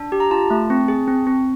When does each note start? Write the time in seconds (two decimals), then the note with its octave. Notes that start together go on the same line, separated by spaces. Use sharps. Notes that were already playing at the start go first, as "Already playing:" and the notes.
Already playing: D4
0.12 G4
0.20 A#5
0.31 F4 A5
0.50 A3
0.70 C4
0.88 G#4
1.08 C4
1.27 C4